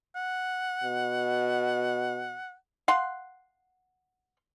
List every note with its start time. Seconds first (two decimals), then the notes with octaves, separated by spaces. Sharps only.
0.15 F#5
0.84 B2
2.88 F5 F#5 C6